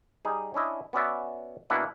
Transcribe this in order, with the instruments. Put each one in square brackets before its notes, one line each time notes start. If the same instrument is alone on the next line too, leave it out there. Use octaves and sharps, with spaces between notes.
[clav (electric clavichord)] G3 D#4 G#4
C#4 D4 E4 D#5
B3 C#4 F#4 D5 E5
B2 A#3 D4 E4 F#5 G#5